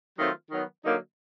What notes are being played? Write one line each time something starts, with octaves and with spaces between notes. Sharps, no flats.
D#3 F#3 A3 C4 F4
D#3 F#3 B3
D3 F#3 A#3 D#4